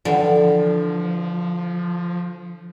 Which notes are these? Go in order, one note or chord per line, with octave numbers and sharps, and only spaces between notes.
D3 E3 F3 G3